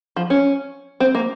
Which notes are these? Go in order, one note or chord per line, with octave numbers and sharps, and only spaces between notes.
F3
C#4
C4
A#3